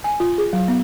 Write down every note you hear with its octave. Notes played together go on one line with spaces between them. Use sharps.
G#5
F4
G#4
F#3
B3